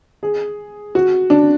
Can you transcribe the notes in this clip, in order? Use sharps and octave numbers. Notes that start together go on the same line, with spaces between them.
G#4
F#4
D4